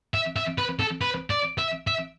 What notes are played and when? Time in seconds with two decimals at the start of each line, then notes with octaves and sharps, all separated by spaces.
0.14 E5
0.36 E5
0.58 B4
0.79 A4
1.01 B4
1.30 D5
1.58 E5
1.87 E5